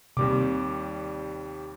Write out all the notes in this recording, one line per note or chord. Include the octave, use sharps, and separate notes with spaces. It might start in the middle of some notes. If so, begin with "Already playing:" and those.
D#2 C3 G3 D6